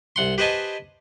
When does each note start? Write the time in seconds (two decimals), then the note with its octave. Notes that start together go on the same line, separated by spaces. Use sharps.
0.16 C2 F#5 C6
0.38 G4 B4 C5 D#5 G#5 A5